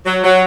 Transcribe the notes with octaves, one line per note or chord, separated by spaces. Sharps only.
F#3
F#3